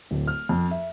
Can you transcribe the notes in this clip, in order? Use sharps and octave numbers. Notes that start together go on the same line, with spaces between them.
D1
F6
F2
E5